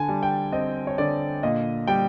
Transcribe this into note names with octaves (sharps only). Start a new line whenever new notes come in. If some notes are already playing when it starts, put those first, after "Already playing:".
Already playing: D3 G#5 A5
G3
G5
C4 D#5
C#5
D3 D5
A#2 D#5
G3 G5